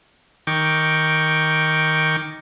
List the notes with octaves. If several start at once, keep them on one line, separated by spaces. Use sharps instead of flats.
D#3 G5 C#6 D6